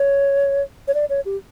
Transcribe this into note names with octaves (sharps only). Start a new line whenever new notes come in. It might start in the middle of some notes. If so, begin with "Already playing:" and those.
Already playing: C#5
C#5
D5
C#5
G4